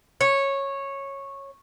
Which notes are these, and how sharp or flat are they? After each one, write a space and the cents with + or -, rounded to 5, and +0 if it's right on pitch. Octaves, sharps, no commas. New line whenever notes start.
C#5 -10